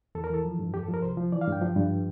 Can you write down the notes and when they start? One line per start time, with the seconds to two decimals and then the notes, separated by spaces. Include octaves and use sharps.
0.15 E2 A4
0.24 A#4
0.30 E3 A4
0.45 F3
0.59 G2
0.74 F2 G4
0.83 A4
0.88 F3
0.94 A#4
1.02 C2 C5
1.17 F3
1.32 E3 D5
1.41 F5
1.47 G2 G5
1.61 F3
1.76 G2